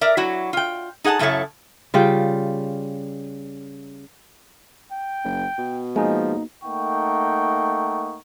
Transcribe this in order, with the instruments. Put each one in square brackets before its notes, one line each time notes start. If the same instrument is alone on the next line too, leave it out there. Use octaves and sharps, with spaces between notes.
[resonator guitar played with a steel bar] A#4 D5 E5
F#3 E4 F#4
F4 G5
D#4 G#4 F#5 G5 A5
F#2 C#3 E4 A4 C#5 A5
[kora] C#3 G3 F4 G5
[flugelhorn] G5
[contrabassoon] F#1
B2
[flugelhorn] F3 [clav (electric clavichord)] G#3 [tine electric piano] A#3 D#4
[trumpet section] A3 A#3 D#4 F#5 G5 C#6